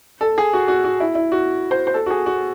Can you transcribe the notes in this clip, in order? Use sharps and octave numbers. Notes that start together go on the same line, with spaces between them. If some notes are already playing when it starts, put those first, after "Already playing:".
A4
G#4
F#4
F#4
F#4
E4
E4
F#4
C5
C5
A4
F#4
G#4
F#4